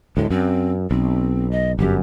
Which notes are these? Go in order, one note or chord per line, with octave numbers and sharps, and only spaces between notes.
D2 A2 G#3
F#2 C4
B1 C4
D#5
G1 F#2 G4